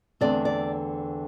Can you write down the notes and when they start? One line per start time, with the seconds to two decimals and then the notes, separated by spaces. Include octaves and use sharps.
0.21 E2 D3 A3 C4 D5
0.45 D5